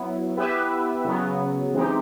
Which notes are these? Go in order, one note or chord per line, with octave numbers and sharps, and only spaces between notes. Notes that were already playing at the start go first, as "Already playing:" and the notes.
Already playing: F#3 B3 E4
B3 E4 G4 B4 E5
C#3 F#3 B3
E3 G#3 C4 D#4 G4